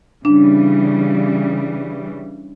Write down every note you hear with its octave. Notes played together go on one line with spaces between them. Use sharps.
C#3 E3 G3 D4